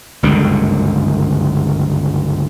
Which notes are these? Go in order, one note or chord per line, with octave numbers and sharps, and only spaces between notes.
G1 C#2 F#2 D3